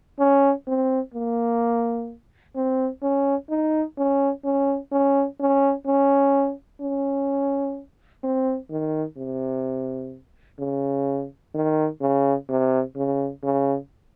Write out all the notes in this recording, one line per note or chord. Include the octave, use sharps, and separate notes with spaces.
C#4
C4
A#3
C4
C#4
D#4
C#4
C#4
C#4
C#4
C#4
C#4
C4
D#3
C3
C#3
D#3
C#3
C3
C#3
C#3